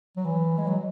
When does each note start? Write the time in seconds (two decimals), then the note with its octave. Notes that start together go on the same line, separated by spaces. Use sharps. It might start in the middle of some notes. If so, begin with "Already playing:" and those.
0.17 F#3
0.25 E3
0.58 G#3
0.67 F#3